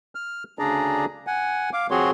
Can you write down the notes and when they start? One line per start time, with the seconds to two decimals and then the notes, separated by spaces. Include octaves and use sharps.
0.15 F6
0.59 D2 C#3 D4 G#4 D5 A#5
1.27 F#5 G#5
1.73 F5 D6
1.91 F3 C4 F#4 G#4 C#5 C6